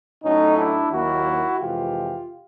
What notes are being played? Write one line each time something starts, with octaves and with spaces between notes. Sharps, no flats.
A2 F#3 A3 C#4 D#4
D4 E4
D#2 D#3 F#3 A#3 E4 F#4
F2 C3 E3 G#3 F4 G4